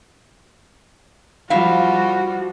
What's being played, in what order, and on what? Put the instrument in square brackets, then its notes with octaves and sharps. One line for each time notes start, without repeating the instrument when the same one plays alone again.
[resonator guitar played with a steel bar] F2 E4 F5 [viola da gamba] F3 G3 [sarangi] F#4